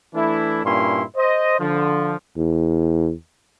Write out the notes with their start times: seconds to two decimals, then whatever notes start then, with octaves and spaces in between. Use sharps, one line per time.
0.15 E3 A3 D4 E4
0.65 G2 A#2 C#4 E4 C6
1.16 C5 D#5
1.59 D3 F3
2.37 E2